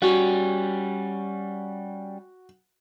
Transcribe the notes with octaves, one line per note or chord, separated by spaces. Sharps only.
G3 C#4 F#4